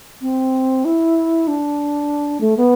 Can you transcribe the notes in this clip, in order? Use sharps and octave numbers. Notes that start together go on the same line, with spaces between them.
C4
E4
D4
A3
B3